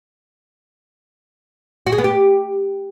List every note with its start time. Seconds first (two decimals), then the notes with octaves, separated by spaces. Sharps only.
1.87 F#4
1.92 G#4
1.98 B3
2.04 G4